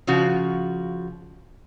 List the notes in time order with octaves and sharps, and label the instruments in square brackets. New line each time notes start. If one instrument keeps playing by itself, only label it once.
[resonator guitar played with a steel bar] C#3 F3 F#4